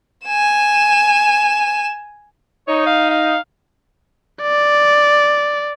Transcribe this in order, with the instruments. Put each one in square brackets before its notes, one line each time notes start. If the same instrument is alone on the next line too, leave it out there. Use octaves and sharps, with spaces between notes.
[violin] G#5 E7
[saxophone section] D#4 [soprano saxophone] C#5
[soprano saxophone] F5
F5
[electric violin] D5